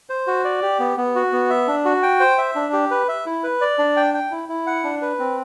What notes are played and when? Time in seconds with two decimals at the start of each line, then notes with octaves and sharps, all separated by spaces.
0.10 C5
0.27 F#4
0.45 D5
0.62 G4
0.80 B3
0.97 B3
1.15 F#4
1.32 B3
1.50 E5
1.67 D4
1.85 F#4
2.03 G5
2.20 C5
2.38 E5
2.55 D4
2.73 G4
2.91 B4
3.08 E5
3.26 E4
3.43 B4
3.61 D5
3.78 D4
3.97 G5
4.14 G5
4.31 E4
4.49 E4
4.67 F#5
4.84 D4
5.02 B4
5.19 C4